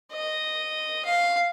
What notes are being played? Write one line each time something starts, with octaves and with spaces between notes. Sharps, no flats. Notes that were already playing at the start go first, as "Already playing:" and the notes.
D#5
F5